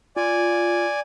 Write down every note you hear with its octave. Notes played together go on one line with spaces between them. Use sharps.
F4 D5 G#5